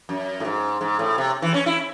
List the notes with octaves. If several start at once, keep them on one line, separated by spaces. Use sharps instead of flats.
F#2
A2
G#2
G#2
A2
C3
E3
C#4
E4